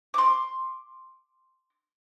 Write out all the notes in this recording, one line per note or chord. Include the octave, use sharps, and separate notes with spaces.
C6 D6